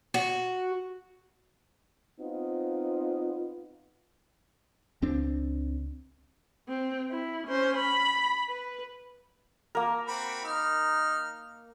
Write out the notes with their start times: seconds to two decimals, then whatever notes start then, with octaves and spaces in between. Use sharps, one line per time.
0.14 F#4
2.19 B3 C4 D#4 F4
5.02 C#2 C4 D4
6.69 C4
7.11 E4
7.48 C#4 C5
7.77 B5
8.48 B4
9.75 A#3 A#4
10.08 C4 F#4 B5
10.45 D#4 F6